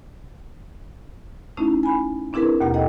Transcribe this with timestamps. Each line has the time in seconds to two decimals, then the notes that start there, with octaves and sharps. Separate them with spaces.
1.57 A3 C#4 D#4 E4
1.83 G#5 B5
2.33 C4 D4 E4 G#4 A#4 B4
2.61 D#2 B2 A#3 G4 F#5
2.74 A4 D#5 F#5 G5